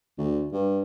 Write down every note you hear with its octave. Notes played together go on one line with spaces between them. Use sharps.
D2
G2